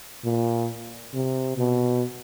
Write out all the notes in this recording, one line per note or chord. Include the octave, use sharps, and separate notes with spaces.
A#2
C3
B2